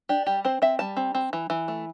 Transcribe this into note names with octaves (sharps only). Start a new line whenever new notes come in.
D4 G4
G3 G4
C4 C5
C4 E5
G3 A5
C4
C4
E3
E3
A3